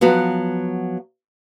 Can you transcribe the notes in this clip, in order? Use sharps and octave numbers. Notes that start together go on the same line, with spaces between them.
F3 F#3 B3 F#4